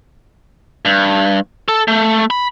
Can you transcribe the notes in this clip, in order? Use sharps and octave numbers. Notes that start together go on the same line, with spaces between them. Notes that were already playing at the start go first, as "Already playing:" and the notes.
G2
A4
A3
B5